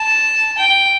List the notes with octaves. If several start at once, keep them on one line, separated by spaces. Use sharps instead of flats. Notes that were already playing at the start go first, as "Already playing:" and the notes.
Already playing: A5
G5